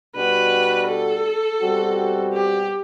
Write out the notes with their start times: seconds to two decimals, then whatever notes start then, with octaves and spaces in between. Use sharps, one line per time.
0.16 B2 G3 D4 F#4 B4
0.88 A4
1.60 B2 G3 C4 F#4
2.33 G4